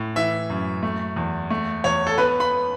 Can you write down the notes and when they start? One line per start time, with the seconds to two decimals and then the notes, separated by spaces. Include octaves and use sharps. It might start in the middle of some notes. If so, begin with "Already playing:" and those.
Already playing: A2
0.16 E3 E5
0.50 F#2
0.83 A3
1.16 E2
1.50 A3
1.84 E2 C#5
2.07 A4
2.18 B3 B4
2.40 B5